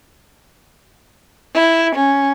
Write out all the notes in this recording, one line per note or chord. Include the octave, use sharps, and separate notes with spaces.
E4
C#4